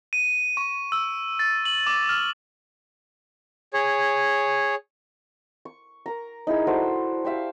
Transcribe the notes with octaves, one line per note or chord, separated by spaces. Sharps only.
D#7
C#6
E6
A6
F#7
D6
F6
G#4 C#5
C#6
A#4 A#5
D#4 E4 G#4
F#4 A4 C5 D5
G4 C5 E5 F5